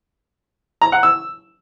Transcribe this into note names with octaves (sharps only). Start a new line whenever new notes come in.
A#5
F#5
E6